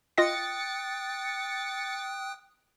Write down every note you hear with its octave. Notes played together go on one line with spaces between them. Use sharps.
F4 D#5 G5 D#6 F#6 A6 A#6 C#7